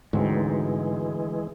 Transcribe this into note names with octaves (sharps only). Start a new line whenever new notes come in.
D2 G#2 E3 F#3 G#3 C4